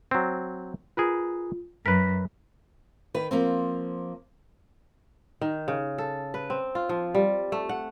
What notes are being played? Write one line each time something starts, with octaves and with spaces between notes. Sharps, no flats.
F#3 C4
F4 G#4 A#4 B4
F#2 A#4 B4 A#6 B6
D#3 B4
F3 A#3 C4
D#3
C#3
A4
B4
C4
F4
F3
G3
A3
F#5